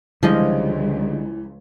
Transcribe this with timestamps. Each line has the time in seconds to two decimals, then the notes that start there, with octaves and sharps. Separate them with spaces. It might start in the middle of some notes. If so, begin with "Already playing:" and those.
0.23 C#2 D3 E3 F3 G3 G#3 D#5